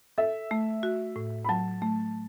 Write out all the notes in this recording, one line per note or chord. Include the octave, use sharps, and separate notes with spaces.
A4 E5
A3
F#4
A2
B5
F#3 A5
A3